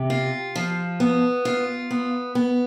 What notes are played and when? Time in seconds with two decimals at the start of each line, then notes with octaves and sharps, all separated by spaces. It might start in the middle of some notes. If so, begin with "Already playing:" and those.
Already playing: C3
0.10 F4
0.56 F3
1.00 B3
1.45 F4
1.91 B3
2.35 B3